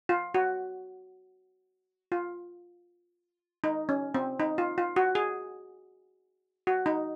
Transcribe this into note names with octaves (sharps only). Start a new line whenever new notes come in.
F4
F#4
F4
D#4
C#4
C4
D#4
F4
F4
F#4
G#4
F#4
D#4